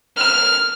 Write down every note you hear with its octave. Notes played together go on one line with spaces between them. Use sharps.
F6